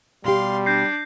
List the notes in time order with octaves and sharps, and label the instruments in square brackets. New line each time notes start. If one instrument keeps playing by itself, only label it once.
[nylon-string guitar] B2 G4 [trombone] G3 [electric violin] F5 C6
[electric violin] D4 [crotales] G6 A#6 C7